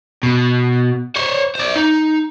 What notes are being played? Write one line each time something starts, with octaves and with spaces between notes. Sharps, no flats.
B2
C5 C#5
C5 D5
D#4